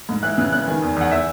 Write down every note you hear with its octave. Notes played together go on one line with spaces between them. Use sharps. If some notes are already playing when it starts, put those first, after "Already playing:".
G#2
E3 F#6
C#3 F#6
B3 F#6
D#3 G#5
E2
E2 F#5
E3 E5